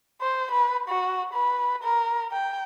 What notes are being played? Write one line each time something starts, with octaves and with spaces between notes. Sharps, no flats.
C5
B4
F#4
B4
A#4
G5